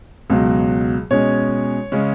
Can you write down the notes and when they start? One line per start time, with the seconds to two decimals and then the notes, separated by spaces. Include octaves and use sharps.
0.30 C#2 B2 F#3
1.11 B2 G#3 C#4 C#5
1.92 C#3 G#3 C#4